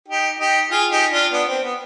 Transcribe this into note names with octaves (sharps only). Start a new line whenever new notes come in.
D#4 G4
D#4 G4
F4 G#4
D#4 G4
D4 F4
B3 D4
C4
B3